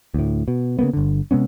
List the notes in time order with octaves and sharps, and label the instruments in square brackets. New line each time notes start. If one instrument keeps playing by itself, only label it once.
[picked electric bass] D2 A2
B2
C#3 G3 A#3 B3
G1 D3
C3 G#3 B3 C#4